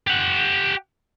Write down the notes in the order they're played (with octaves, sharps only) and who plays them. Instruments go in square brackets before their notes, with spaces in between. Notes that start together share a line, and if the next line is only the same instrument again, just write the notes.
[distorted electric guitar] G4 F#5